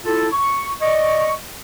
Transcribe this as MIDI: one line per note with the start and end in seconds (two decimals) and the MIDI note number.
0.05 0.28 64
0.05 0.28 65
0.05 0.28 69
0.33 0.70 85
0.82 1.33 74
0.82 1.33 75
0.82 1.33 85